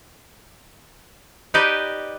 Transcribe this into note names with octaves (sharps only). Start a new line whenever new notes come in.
D#4 G4 B4 D5 D#5